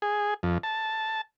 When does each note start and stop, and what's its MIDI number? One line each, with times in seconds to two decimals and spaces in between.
0.02 0.34 68
0.43 0.58 41
0.63 1.21 81